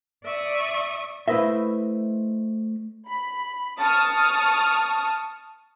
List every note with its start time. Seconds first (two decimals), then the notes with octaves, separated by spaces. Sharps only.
0.25 D5 E5 C#6 D#6
1.28 A3 E4 B4 C5 D#5 E5
3.08 B5
3.80 A5 C#6 D#6 F6